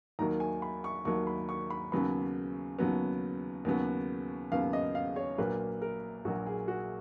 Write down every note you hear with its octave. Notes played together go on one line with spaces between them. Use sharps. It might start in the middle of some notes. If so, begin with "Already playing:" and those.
D#2 D#3 F#3 A#3 A#5
G#5
B5
C#6
D#2 D#3 F#3 A#3 C#6
B5
C#6
B5
D#2 C#3 F#3 B3 B5
D#2 C#3 F#3 B3
D#2 C#3 F#3 B3
D#2 C#3 F#3 B3 F5
D#5
F5
C#5
A#1 A#2 F#3 A#3 B4
A#4
A#1 A#2 F#3 A#3 F#4
G#4
F#4